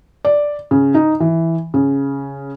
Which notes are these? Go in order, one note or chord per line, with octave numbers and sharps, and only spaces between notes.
D5
C#3
D#4
E3
C#3